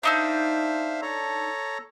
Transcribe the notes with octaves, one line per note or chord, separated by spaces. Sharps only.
D4 D#4 C5 E5 F5 E6
A4 C#5 A#5